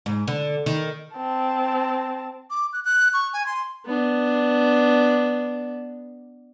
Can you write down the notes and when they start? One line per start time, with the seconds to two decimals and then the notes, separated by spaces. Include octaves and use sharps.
0.06 G#2
0.27 D3
0.66 D#3
1.16 C4 A5
2.50 D6
2.73 F#6
2.85 F#6
3.14 C#6
3.33 G#5
3.46 C6
3.86 B3 D4